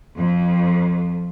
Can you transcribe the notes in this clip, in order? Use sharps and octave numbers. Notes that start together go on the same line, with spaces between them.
F2